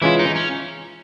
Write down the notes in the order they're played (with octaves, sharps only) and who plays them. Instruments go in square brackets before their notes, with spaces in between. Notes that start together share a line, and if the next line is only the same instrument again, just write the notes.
[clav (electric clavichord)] E3 G#3 C#4 F4 [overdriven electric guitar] E4
[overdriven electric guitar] D#4
C#4